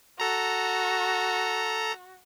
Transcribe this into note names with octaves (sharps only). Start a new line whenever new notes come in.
F#4 A4 A#5